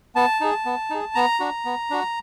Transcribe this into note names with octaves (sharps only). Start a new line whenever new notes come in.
B3 A5
D#4 G#4
B3
D#4 G#4
B3 A#5
D4 F#4
B3
D4 F#4